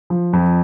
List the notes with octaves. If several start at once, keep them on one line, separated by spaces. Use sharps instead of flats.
F3
F2